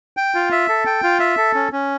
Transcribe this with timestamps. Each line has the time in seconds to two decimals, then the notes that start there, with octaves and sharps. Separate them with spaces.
0.17 G5
0.35 F4
0.52 E5
0.69 A4
0.86 G5
1.03 F4
1.20 E5
1.37 A4
1.54 C#4
1.72 C#4